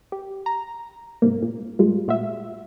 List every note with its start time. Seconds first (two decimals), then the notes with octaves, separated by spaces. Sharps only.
0.12 G4
0.46 A#5
1.22 G#2 C3 A#3
1.42 A#2
1.79 A2 G3 G#3 F4
2.08 A#2 F4 F#4 E5